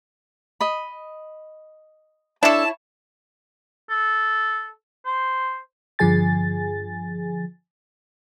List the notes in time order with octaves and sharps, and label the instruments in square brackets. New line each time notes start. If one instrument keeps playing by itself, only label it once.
[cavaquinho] D#5 B5
[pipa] D4 A4 [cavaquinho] E4 C#5 [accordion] A5
[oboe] A4
C5
[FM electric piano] G2 D3 F3 G#4 G#5 A6